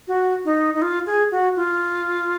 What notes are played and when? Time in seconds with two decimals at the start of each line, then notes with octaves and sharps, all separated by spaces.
0.08 F#4
0.45 D#4
0.74 D#4
0.82 F4
1.06 G#4
1.31 F#4
1.56 F4